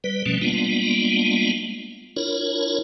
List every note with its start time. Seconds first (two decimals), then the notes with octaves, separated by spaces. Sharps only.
0.04 G3 B4
0.26 B2 F3 G3 A3 C#4
0.41 G3 G#3 A#3 B3 D4 F4
2.16 D4 E4 F4 A#4 C#5